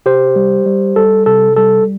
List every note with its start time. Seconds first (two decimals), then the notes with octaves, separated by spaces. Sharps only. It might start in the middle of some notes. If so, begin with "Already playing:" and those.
0.06 C3 G4 C5
0.36 G3
0.66 G3
0.96 G3 A4
1.26 C3 A4
1.56 G3 A4